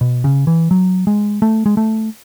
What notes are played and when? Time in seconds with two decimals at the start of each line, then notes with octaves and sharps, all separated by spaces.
0.01 B2
0.24 C#3
0.47 E3
0.71 F#3
1.07 G#3
1.42 A3
1.66 G#3
1.77 A3